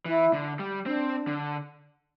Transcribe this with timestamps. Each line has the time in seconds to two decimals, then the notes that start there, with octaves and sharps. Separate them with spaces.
0.06 E3 E4
0.33 D3
0.59 G3
0.86 C4 D4
1.27 D3